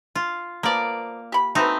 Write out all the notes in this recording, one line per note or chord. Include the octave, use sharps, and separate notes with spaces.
F4
F3 A#3 B3 D5
G4 B5
A3 C4 D#4 F#4 B4